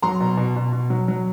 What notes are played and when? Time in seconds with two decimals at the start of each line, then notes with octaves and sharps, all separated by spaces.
0.02 F#3 A#5 C6
0.20 B2
0.37 B2
0.56 B2
0.72 B2
0.90 F#3
1.08 F#3